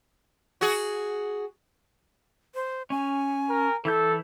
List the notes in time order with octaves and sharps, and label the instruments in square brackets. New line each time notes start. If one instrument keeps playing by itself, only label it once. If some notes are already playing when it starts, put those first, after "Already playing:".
[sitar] F#4 G#4
[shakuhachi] C5
[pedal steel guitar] C#4 [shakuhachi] G#5
[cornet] A#4
[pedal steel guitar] E3 G6 [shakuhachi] E4 [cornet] A4